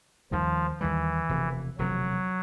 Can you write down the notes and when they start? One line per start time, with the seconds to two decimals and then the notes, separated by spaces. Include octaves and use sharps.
0.31 D#2 D#3 F3 G3
0.80 D#2 D#3 E3 G3
1.29 E1 D2 C3 F3
1.78 E1 D2 C3 F3 F#3